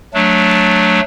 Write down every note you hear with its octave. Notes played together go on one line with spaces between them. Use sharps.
F#3 A3 D4